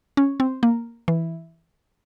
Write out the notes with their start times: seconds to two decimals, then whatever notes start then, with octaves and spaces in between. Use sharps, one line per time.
0.17 C#4
0.40 C4
0.63 A#3
1.08 E3